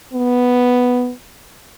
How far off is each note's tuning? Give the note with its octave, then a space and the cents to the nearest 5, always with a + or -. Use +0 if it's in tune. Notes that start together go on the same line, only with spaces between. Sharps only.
B3 +0